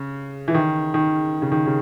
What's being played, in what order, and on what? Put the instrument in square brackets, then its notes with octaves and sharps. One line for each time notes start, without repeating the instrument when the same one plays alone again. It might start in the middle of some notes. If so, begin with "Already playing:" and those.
Already playing: [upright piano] C#3
E3
D#3
D#3
C#3
D#3
C#3